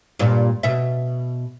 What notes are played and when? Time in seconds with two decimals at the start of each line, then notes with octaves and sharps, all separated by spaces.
0.19 G2 A#2
0.63 B2 E5